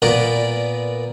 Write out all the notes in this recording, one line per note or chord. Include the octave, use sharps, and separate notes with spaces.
A#2 B3 A#4 B4 D5 B5